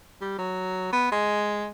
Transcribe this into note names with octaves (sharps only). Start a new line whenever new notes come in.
G3
F#3
B3
G#3